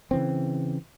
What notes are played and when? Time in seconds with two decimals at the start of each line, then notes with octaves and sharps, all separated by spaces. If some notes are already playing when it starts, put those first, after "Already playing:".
0.11 C#3 E3 C4